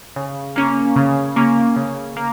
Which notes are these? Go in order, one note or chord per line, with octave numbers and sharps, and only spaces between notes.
C#3
A#3 C#4
C#3
A#3 C#4
C#3
A#3